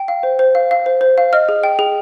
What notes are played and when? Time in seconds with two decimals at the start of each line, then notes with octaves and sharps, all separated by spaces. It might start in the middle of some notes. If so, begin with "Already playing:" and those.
Already playing: G5
0.08 F5
0.23 C5
0.39 C5
0.55 F5
0.71 F5
0.86 C5
1.01 C5
1.18 F5
1.33 D#5 F6
1.49 G#4
1.63 G5
1.79 G#4